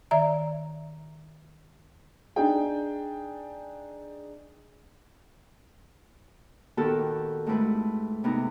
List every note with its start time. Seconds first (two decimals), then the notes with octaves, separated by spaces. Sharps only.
0.11 D#3 D5 E5 A#5
2.36 D4 D#4 G#4 G5
6.77 A#2 D#3 B3 F#4 G4 A4
7.46 G#2 A3 C4 E4 B4
8.24 C3 B3 D#4